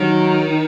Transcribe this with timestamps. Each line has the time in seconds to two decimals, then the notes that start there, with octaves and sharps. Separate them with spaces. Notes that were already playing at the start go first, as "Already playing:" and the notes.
Already playing: D#3 F#3